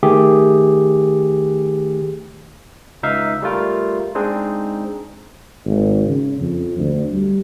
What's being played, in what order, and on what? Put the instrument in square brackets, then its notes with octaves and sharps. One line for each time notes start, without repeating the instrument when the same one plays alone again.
[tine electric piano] D#3 A3 G4 G#4
C#2 D#4 E5 F5
G3 A3 F4 A#4
G#3 C4 D4 D#4 G#4
[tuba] G#1
C#3
F2
D2
G3